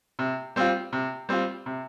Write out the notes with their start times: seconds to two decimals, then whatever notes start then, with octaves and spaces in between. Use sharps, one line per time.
0.19 C3
0.56 G3 C4 F4
0.93 C3
1.29 G3 C4 F4
1.66 C3